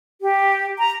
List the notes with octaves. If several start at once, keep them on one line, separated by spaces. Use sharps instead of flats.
G4
A#5